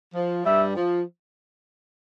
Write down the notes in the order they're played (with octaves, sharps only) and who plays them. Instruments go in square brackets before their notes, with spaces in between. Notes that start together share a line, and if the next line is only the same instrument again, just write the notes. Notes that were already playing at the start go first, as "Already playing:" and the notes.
[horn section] F3
[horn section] G2 G3 [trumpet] E5
[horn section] F3